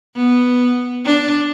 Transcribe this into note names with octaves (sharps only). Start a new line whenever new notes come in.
B3
D4